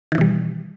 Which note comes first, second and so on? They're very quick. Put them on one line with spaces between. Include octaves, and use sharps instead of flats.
D#3 E3 B2 G3